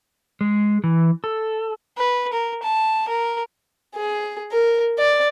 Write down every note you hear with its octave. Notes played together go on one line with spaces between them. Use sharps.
G#3
E3
A4
B4
A#4
A5
A#4
G#4
A#4
D5